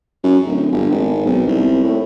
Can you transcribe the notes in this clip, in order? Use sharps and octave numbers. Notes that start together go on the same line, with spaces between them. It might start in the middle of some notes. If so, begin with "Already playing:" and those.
F#2
D1
G1
G#1
B1
C2
A2